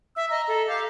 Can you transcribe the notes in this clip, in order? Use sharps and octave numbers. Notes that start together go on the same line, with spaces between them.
E5 E6
D#5 A#5
A4
G4 F5